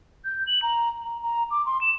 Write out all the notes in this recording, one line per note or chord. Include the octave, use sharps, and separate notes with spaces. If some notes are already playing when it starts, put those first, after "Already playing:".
G6
F#7
A#5
A#5
A#5
D6
C6
E7